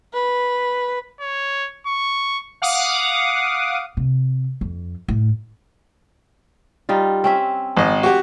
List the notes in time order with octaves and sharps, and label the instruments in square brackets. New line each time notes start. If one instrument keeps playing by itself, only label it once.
[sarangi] B4
[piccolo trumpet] C#5
C#6
[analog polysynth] F5 F#5 D6 D#6
[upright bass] C3
F2
A2
[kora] G3 D#4 F4
C4 C#4 E5
[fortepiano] G#1 D#5
F#4 G4